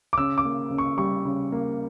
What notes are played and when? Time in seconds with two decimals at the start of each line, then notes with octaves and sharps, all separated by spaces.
0.13 D6
0.17 C#3 E6
0.38 D6
0.45 A#3
0.71 C#3
0.78 C#6
0.97 G3 C#6
1.25 C#3
1.52 A#3